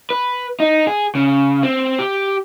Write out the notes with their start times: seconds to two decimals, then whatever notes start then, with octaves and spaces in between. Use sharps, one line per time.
0.10 B4
0.60 D#4
0.87 G#4
1.15 C#3
1.63 C4
1.99 G4